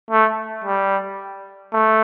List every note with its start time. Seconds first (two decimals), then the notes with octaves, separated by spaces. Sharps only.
0.11 A3
0.64 G3
1.73 A3